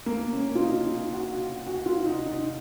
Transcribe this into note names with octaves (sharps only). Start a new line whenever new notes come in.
A#3
C#4
F4
D#4
F4
F#4
F#4
F4
D#4
D#4